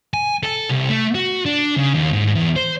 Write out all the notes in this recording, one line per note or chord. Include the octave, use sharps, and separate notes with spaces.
G#5
A4
C2
A3
F#4
D4
C#3
D#2
G#2
E2
C5